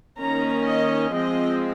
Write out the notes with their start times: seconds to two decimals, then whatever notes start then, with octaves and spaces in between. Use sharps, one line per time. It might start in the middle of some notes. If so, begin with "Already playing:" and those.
0.20 D#3 A#3 C#4 A#5
0.66 D#5
1.13 F3 G#3 C4 D#5